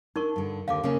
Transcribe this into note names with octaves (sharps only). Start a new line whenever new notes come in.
D4 D#4 A#4 C#6
G2 D3
D#2 D3 F5 D6
C#3 A#3 C#4